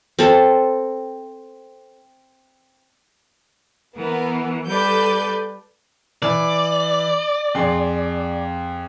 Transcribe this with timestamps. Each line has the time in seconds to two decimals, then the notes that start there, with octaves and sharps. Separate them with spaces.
0.19 C4 A4
3.96 E3 B3 A#4
4.67 G3 A4 B4 D5 G6
6.22 E3 D5
7.55 F2 G#4 C6